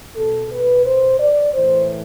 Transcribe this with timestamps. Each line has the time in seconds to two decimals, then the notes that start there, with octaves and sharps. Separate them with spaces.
0.16 B2 A4
0.51 B4
0.85 C5
1.20 D5
1.54 A2 E3 C5